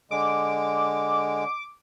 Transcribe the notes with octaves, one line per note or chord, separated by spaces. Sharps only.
D3 G#3 D6